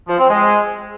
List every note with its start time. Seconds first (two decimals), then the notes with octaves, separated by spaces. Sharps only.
0.08 F3
0.19 C4
0.29 G#3